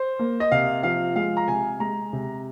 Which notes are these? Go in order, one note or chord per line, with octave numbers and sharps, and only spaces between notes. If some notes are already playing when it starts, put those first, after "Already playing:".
Already playing: C5
A#3
D#5
C3 F5
F3 F5
G#3 F5
A#5
C3 G#5
G#3 A#5
C3